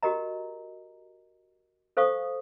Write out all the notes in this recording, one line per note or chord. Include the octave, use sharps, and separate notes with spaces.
F#4 G4 A#4 D#5 A#5
A4 C5 F5 C#6 D#6